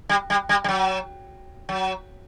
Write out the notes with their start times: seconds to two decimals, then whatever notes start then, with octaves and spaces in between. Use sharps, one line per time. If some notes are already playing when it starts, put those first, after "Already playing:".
0.09 G3
0.30 G3
0.49 G3
0.64 G3
0.68 F#3
1.69 F#3